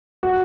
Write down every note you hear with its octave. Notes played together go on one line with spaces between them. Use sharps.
F#4